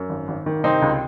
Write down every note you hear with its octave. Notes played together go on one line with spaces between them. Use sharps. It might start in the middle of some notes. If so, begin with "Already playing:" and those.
Already playing: F#2
G#1
G#1
D#3
C3 C4 D#4
C#2